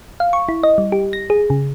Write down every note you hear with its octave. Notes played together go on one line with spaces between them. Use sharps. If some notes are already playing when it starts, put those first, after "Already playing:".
F5
C#6
E4
D#5
G3
G4
A#6
G#4
C#3